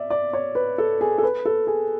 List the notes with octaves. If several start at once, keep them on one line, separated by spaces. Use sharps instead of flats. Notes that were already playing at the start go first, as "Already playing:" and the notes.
Already playing: D5 E5
D5
C#5
B4
A4
G#4
A4
B4
A4
G#4